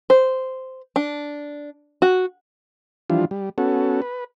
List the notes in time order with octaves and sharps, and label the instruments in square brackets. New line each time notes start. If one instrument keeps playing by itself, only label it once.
[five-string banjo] C5
D4
F#4
[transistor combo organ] E3 F3 G3 D4 F4
G3
B3 C#4 F#4 A4
B4